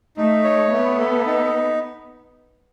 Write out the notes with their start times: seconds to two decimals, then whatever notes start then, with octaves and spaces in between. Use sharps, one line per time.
0.17 A3 D#4
0.44 C#5
0.71 A3 B3
0.99 A4
1.26 D#4